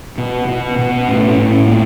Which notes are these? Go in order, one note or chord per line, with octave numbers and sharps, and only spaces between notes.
B2
B2
B2
A2 C#4
C#4
A2
A2 A#3